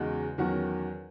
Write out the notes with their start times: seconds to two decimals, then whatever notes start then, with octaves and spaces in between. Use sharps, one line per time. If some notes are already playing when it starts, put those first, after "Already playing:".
Already playing: E2 C#3 G#3 D#4 F#4
0.38 E2 D#3 F#3 C#4 F#4